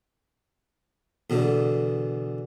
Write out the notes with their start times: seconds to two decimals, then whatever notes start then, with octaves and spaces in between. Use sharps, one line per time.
1.30 E2 B2 D3